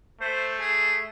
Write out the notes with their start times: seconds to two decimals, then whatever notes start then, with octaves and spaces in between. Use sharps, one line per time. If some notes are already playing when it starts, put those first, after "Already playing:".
0.21 A3 C5
0.60 G#4